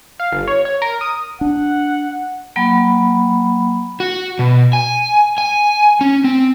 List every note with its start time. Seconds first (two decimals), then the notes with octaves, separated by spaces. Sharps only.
0.20 F5
0.32 G1
0.48 C#5
0.65 C#5
0.82 A#4
1.01 D#6
1.41 D4 F#5
2.56 F#3 A#3 G5 B5
4.00 F#4
4.39 B2
4.73 G#5
5.38 G#5
6.01 C#4
6.24 C4